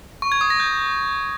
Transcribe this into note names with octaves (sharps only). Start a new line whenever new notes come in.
C#6
G#6
D#6
A#6
G6